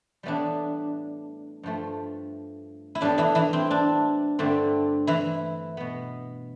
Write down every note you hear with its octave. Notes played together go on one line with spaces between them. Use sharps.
A2 E3 G3 B3 D4
G2 F3 A3
E4
A2 G3 B3 D4
E3 E4
E3 E4
C4
D4
G2 D3 A3 C4
E3 E4
B2 B3